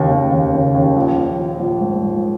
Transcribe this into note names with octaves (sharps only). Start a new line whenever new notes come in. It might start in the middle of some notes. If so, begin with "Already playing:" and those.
Already playing: D#2 C#3
D#2
D#2
C#3
D#2
A#1
A#1
F3
A#1
G#2
G#2